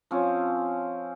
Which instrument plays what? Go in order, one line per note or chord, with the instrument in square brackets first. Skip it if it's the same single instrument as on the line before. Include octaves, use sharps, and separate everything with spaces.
[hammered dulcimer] F3 C4 C#4